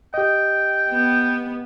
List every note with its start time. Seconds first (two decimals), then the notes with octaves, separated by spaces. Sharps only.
0.14 G4 D#5 G5
0.90 B3